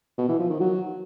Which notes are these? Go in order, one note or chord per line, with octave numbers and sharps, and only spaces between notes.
B2
E3
F3
D#3
F#3